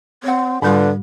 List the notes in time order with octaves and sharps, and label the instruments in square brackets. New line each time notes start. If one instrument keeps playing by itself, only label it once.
[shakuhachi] C4 [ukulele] C#5 F#5
[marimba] G#2 G3 [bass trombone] D3 [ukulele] F4 B5 [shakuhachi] B4